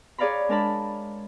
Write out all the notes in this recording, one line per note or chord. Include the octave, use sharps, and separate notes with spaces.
G#4 C#5 D5 F5 A#5 B5
G#3 D4 A#4 A5 B5